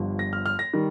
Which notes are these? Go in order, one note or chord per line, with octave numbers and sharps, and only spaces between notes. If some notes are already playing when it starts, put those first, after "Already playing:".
Already playing: G1 G2 F3
A#6
F6
F6
A#6
D#3 G3